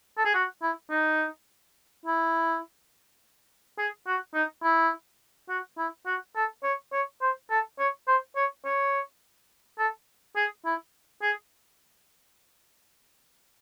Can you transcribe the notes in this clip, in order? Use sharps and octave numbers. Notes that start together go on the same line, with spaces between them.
A4
G#4
F#4
E4
D#4
E4
G#4
F#4
D#4
E4
F#4
E4
F#4
A4
C#5
C#5
C5
A4
C#5
C5
C#5
C#5
A4
G#4
E4
G#4